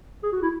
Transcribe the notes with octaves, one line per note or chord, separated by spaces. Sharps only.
G#4
F#4
E4